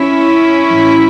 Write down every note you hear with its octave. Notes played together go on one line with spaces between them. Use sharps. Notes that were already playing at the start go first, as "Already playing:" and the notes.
Already playing: C#4 E4
A2 E3